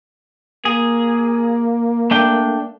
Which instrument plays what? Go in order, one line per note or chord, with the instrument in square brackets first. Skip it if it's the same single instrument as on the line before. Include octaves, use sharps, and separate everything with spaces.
[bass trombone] A#3 [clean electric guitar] G#4
[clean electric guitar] A3 D4 G5